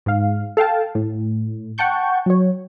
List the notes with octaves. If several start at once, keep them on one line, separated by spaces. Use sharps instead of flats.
G#2 F5
A4 F5 G5 A5
A2
F#5 G5 A5 C#6 G6
F#3 C#5